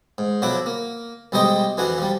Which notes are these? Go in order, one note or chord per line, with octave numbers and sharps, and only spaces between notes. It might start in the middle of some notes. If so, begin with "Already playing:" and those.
G#2
B1 F3 F#3 E4 F#4 D6
A#3
B1 G3 G#3 C5 D#5 G5
F2 E3 D4 F#4 G#5
F3 G3